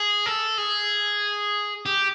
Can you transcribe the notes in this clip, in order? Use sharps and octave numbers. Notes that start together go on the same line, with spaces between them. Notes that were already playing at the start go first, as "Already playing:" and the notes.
Already playing: G#4
A4
G#4
G4